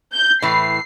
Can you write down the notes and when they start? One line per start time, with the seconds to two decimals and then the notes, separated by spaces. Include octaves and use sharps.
0.13 G6
0.42 A2 E3 C7